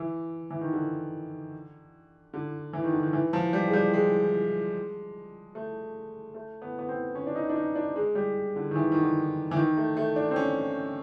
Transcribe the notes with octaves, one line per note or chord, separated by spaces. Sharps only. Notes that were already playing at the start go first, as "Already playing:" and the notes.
Already playing: E3
E3
D#3
D3
D3
E3
D#3
D3
D#3
E3
F3
G3
G#3
G3
G#3
A3
A3
B3
B3
C4
C#4
D4
D#4
D4
D#4
D4
G#3
G3
D3
D#3
E3
D#3
D3
E3
D#3
A3
A3
D4
C4
C#4